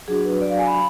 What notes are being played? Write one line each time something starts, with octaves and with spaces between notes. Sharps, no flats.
F#3 D4 F#4 G#4
B4
D5
F5
G#5
B5